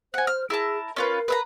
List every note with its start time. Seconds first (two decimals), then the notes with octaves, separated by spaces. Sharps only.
0.14 C5 F#5 G#5
0.27 F6
0.50 E4 G#4 A#4 A5
0.96 C#4 F4 A#4 B4
1.28 B4 E5 A#5